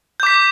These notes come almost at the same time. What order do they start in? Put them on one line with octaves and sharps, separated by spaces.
G6 D6 B6